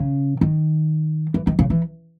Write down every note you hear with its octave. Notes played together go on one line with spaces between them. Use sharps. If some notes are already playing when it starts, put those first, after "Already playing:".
Already playing: C#3
D#3
E3
D#3
C#3
E3